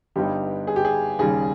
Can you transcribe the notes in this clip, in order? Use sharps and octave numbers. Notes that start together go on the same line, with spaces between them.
G1 G2 G3 B3 D#4 G4
G#4
G4
G#4
D#2 C#3 G3 G#4